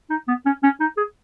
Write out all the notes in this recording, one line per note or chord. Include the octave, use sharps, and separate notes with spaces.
D#4
B3
C#4
C#4
D#4
G#4